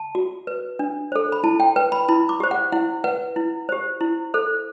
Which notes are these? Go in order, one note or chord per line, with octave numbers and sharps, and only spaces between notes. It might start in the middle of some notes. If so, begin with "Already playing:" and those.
Already playing: A5
F#4
B4
D4
A4 C5
B5
E4 A5
G5
B4 G5
B5
E4 B5
D6
G4 C5
F#5
E4 F#5
B4 F#5
E4
G4 C5
E4
A4 C5